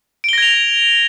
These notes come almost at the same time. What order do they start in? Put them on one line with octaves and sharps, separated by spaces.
D7 G7 A#6 G#6 F7